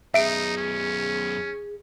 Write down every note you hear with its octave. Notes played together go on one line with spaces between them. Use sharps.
F#2 B3 D#4 G#4 E5 D7
C#4